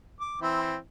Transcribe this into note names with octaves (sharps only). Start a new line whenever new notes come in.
D6
E3 C4 E4